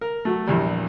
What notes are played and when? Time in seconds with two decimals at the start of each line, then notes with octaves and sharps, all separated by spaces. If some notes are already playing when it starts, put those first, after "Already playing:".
0.01 A#4
0.25 F#3 A3
0.47 A#1 E2 G3